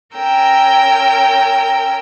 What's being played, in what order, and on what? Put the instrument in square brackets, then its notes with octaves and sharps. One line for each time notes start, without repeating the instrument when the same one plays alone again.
[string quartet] C#4 A#4 G5 E6